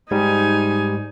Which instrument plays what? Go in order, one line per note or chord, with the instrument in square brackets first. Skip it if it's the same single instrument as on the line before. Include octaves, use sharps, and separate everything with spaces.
[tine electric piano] G#2 G3 [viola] D#4 G#5